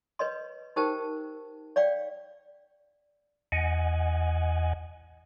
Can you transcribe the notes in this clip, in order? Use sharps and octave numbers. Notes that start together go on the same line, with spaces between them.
B4 C#5 D#5 C6
D#4 G4 A#4 C5 G5 A5
C#5 D5 F5 G5
E2 D#5 F#5 G#5